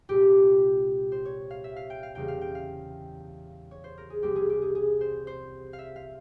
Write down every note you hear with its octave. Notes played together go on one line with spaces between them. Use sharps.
C2 A#2 G#3 G4
C5
C#5
F5
E5
F5
G5
F5
E2 C#3 E3 G3 A#3 G5
F5
G5
F5
C#5
C5
A#4
G#4
C2 C3 G3 A#3 G4
G#4
G4
G#4
G#4
C5
C5
F5
E5
F5